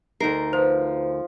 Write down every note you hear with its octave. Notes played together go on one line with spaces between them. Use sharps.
D2 D#4 A#4 C7
F3 B4 C5